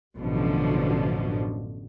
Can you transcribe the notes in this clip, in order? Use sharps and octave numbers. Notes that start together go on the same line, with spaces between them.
A1 F#2 B2 D3 F3